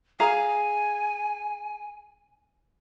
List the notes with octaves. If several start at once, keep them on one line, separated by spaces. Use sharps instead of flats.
G#4 F5 G#5 A#5